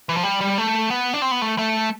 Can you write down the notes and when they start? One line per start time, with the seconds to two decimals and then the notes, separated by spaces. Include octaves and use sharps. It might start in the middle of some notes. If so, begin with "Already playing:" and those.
0.09 E3
0.16 F3
0.23 G3
0.41 G3
0.58 A3
0.90 B3
1.14 D4
1.22 C4
1.31 B3
1.42 A3
1.58 A3